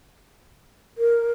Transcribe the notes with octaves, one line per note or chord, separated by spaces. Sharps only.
A#4